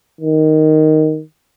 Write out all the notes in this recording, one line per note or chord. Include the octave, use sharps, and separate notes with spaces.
D#3